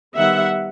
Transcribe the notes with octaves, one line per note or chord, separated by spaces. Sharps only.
D#3 G3 B3 E5 F#5